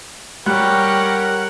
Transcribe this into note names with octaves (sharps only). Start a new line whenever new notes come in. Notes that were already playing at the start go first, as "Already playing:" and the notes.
G3 G4 A#4 C#5 F#5 F#6